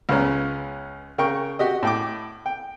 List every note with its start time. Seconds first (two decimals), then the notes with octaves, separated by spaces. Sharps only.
0.09 C#2 C#3 B3 C#4 A#5
1.18 C#3 A#4 G5 C#6
1.59 F#4 G4 D#5
1.83 A2 G5 D6
2.46 G5